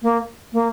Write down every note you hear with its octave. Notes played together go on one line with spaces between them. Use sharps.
A#3
A#3